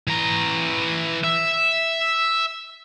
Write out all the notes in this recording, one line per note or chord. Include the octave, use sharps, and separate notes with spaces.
E3 A#5
E5